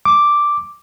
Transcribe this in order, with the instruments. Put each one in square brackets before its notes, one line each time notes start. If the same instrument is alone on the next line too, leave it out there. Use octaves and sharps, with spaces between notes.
[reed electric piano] D6